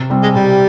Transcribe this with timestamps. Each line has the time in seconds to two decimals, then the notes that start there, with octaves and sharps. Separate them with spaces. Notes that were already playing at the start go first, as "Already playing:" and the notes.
Already playing: C3
0.10 G3 C4
0.23 G#3
0.35 C3 G3